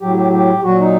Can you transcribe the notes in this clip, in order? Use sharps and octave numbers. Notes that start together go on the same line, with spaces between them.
A2 F#3 G4
G4
G4
A#2 F#3 F#4
D#4